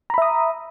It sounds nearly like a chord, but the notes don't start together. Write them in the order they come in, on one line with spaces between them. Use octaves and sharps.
A#5 B5 E5 D#6